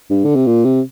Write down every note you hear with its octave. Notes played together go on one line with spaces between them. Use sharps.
G2
D3
C3
A#2
C3